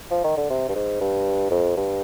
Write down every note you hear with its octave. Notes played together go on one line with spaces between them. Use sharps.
F3
D#3
D3
C3
G2
G#2
G2
F2
G2